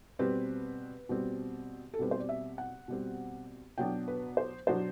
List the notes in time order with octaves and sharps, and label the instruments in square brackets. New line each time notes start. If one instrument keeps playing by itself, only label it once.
[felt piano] B2 G3 C4 B4
B2 G3 C4
A4
B2 G3 C4 B4
C5
D5
E5
F#5
B2 G3 C4
B2 F#3 B3 D4 G5
B4
C5
B2 F#3 B3 D4 C5